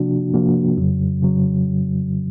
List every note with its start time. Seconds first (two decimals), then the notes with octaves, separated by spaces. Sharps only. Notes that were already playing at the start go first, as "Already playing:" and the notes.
Already playing: C3 F3 A#3 D4 F#4
0.34 C3 F3 A#3 D4 F#4
0.77 F2 C#3 F#3
1.22 C#3 F#3